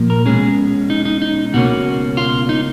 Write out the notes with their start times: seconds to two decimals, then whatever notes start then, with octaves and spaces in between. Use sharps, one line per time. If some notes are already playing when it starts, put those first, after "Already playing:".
Already playing: A#2 F3 A#3
0.10 A#4
0.26 B2 G#3 C#4 G#4
0.90 D#4
1.05 D#4
1.22 D#4
1.53 C#2 B2 A#3 C#4 F#4
2.17 F4
2.49 D#4